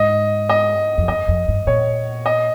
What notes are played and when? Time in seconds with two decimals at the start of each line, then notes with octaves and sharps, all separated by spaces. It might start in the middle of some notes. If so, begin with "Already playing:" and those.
Already playing: G#2 D#5
0.49 D#5
0.98 F2
1.08 G2 D#5
1.28 F2
1.48 G2
1.67 A#2 C#5
2.26 D#5